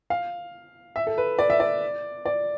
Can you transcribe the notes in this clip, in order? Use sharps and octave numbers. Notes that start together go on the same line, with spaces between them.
F5
E5
A4
B4
D5
E5
D5
D5